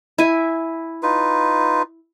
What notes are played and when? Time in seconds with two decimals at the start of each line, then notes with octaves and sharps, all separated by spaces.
0.18 E4 G#5
1.03 D#4 F4 B4